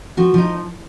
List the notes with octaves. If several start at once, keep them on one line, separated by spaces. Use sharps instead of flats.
F3 F#4
F3 D#4